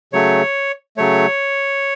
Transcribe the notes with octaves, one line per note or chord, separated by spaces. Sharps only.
C#3 F#3 A3 C#5
C#3 F#3 A3 C#5